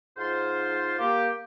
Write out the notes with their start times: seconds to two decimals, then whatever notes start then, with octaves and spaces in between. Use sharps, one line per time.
0.17 G#2 F4 C5
0.99 A#3 G4